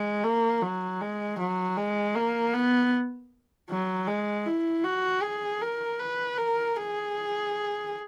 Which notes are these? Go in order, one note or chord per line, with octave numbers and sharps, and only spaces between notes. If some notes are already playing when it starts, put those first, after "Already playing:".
Already playing: G#3
A#3
F#3
G#3
F#3
G#3
A#3
B3
F#3
G#3
E4
F#4
G#4
A#4
B4
A#4
G#4